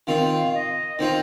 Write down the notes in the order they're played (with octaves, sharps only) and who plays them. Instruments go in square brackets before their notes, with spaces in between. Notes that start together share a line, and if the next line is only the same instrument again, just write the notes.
[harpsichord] D#3 C4 F4 [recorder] F5
[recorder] D#5
[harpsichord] D#3 C4 F4 [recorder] C5